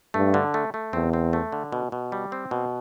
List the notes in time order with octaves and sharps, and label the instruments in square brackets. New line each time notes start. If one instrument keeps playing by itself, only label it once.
[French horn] G2 [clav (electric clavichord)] A3
[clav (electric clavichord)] D3
A3
A3
[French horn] E2 [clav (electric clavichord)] C4
[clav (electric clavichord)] C4
A3
D3
B2
B2
G3
C4
B2